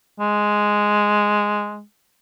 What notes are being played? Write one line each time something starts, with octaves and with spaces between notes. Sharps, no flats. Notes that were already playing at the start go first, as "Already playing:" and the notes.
G#3